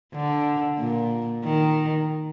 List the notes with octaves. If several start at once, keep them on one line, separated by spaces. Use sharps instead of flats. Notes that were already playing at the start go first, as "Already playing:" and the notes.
D3
A#2
D#3